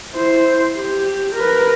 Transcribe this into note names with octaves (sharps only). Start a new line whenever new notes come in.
E4 C5
G4
A#4 B4